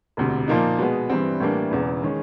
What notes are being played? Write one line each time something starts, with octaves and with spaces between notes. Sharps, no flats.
E1 D2 C3
A#2 F3 A#3 D#4
B2 G#3 B3
G2 E3 G3 C4
A2 E3 G3 A#3 D4
E1 E2 C#3 E3
D#3 G#3 C#4